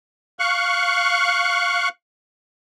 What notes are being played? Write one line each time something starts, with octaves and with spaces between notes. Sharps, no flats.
F5 C#6 F#6